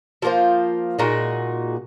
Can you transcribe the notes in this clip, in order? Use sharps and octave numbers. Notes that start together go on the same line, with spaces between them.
F3 A#3 F4 C5
A#2 G#3 D#4 F#4